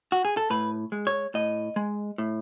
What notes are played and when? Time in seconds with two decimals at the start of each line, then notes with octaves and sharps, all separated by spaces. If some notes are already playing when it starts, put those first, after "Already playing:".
0.12 F#4
0.25 G#4
0.37 A4
0.50 A2 B4
0.92 G#3
1.07 C#5
1.34 A2 D#5
1.76 G#3
2.18 A2